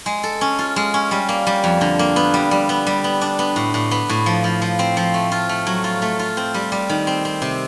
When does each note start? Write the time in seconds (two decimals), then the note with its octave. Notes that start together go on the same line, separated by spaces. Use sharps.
0.06 G#3
0.23 A4
0.41 C#4
0.59 F4
0.76 G#3
0.94 C#4
1.11 G3
1.29 A#3
1.47 G3
1.64 F2
1.81 D3
1.99 A#3
2.16 B3
2.34 G3
2.51 G3
2.69 B3
2.87 G3
3.04 B3
3.21 D4
3.39 B3
3.56 A2
3.74 A2
3.91 B3
4.09 A2
4.26 F3
4.44 F3
4.62 F3
4.79 C4
4.97 F3
5.14 A3
5.32 F4
5.49 A3
5.67 F#3
5.84 F4
6.02 A3
6.19 F4
6.37 C4
6.54 G3
6.72 G3
6.89 D#3
7.07 C4
7.25 C4
7.42 C3